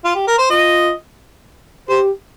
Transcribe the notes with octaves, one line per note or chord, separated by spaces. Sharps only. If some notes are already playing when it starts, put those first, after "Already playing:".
F4
G4
A#4
C5
F4 D#5
G4 C5